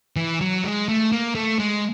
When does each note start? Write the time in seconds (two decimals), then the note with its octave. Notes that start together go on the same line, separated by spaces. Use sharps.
0.16 E3
0.41 F#3
0.64 G#3
0.89 A3
1.12 A#3
1.35 A3
1.59 G#3